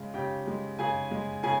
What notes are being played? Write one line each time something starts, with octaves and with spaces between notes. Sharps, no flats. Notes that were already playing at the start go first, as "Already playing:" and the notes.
Already playing: C#3 G#3 F4
C#3 G4 G5
G#3
C#3 G#4 G#5
G#3
C#3 G#4 G#5